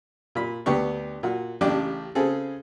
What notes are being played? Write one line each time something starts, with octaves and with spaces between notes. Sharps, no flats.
A#2 B5
D2 B3 G4 C#6
A#2 F#4
A1 C#3 D4 G4 D6
C#3 C4 G#4 A4